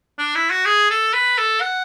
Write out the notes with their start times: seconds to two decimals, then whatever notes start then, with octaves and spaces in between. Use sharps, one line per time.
0.18 D4
0.35 E4
0.50 F#4
0.66 G#4
0.90 A4
1.13 B4
1.38 A4
1.61 F#5